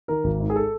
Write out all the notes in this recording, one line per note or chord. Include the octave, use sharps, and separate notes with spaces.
D#3 A#4
G#1
G#2
G#4
A4